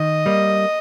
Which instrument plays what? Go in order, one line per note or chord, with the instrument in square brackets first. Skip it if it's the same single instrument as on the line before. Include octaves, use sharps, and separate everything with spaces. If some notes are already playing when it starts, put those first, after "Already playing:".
Already playing: [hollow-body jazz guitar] D#3 [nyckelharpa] D#5
[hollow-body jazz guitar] G3 A#3